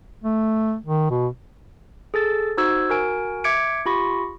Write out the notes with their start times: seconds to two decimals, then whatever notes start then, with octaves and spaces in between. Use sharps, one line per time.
0.24 A3
0.86 D#3
1.10 B2
2.14 G#4 A4 A6
2.57 D#4 F#4 C5 E6 G#6
2.90 F#4 A#4 G#5 D7
3.44 E5 D6 G#6 C#7 D7
3.86 F4 G4 B5 C#6 A#6